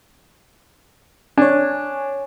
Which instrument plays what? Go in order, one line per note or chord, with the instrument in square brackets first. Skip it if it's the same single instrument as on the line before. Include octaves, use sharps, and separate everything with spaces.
[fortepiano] D4 [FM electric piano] C#5 G#5